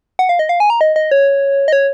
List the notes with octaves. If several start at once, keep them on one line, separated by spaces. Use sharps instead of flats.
F#5
F5
D#5
F5
G#5
A#5
D#5
D#5
C#5
D#5
C#5